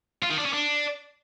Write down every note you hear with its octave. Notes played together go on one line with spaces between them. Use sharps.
F4
D#3
D4
C#4
D4